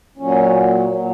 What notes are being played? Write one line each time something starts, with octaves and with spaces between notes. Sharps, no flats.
A#2 F#3 C#4
A#2 F#3